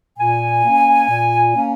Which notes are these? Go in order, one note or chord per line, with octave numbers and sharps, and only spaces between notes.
A#2 G#5
A#3 C#4
A#2
A#3 C#4